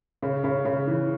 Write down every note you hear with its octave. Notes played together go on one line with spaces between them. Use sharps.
C#3
C#3
C#3
E3